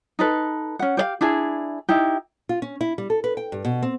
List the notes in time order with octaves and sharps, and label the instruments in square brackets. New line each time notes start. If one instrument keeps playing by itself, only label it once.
[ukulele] D#4 A4 B4
C#4 F#5
G4 C#5 F5
D4 E4 G#4
D#4 E4 G4
[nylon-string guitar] F4
C#4
E4
G3
A4
B4
G5
G2
B2
C4